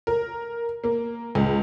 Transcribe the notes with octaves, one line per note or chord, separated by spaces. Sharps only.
A#4
A#3
C#2